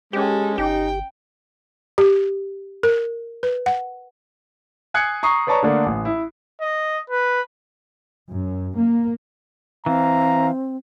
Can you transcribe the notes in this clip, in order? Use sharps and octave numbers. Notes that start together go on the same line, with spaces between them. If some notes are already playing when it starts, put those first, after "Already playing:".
G#3 C#4 G4 A4
G1 D#4 G4 G5
G4
A#4
B4
F#5
G#5 D#6 F#6 G#6 C7 C#7
A#5 C#6 D#6 C7
B4 C#5 D5 A5 A#5 C#6
D3 A3 A#3 D4
A1
E4
D#5
B4
F#2
A#3
E3 C4 F5 A#5